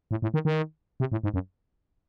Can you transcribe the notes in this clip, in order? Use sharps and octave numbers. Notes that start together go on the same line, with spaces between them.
A2
A2
D#3
D#3
C3
A2
G#2
F#2